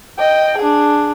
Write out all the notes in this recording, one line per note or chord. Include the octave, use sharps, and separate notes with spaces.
D#5 G5
D4 G#4